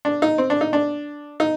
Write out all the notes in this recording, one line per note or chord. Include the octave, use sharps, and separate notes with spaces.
D4
D#4
C4
D4
D#4
D4
D#4